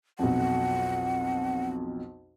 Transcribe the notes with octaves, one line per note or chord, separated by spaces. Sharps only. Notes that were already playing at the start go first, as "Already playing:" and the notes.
B1 F2 F#5